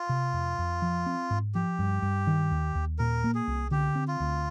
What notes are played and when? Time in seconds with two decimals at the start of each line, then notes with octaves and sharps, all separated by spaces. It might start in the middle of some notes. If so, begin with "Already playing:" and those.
Already playing: F4
0.09 C3
0.33 F2
0.59 F2
0.82 F3
1.06 C4
1.30 G#2
1.55 F3 G4
1.79 G2
2.02 G2
2.27 D#3
2.51 D#2
2.75 D#2
2.99 A#2 A#4
3.24 A#3
3.35 G#4
3.47 C2
3.71 D3 G4
3.95 C4
4.08 F4
4.20 D2